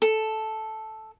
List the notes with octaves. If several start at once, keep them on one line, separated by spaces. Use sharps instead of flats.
A4